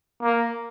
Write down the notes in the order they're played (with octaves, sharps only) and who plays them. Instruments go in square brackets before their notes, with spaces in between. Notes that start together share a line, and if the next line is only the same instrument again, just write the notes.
[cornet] A#3